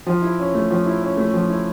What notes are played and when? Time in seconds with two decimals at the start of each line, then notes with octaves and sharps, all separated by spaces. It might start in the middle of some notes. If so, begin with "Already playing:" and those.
0.06 F3
0.22 E4
0.39 C#4
0.54 A3
0.70 F3
0.86 E4
1.03 C#4
1.17 A3
1.34 F3
1.49 E4